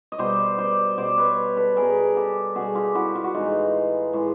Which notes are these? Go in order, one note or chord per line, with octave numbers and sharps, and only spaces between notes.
D#5
B2 G3 C5 D5
C5 D5
B2 G3 C5 D5
B4 C#5
A4 B4
B2 G3 G#4 A#4
G4 A4
B2 G3 F#4 G#4
F4 G4
E4 F#4
F4
F#4
A2 E3 G#3 D#4 F4
A2 E3 G#3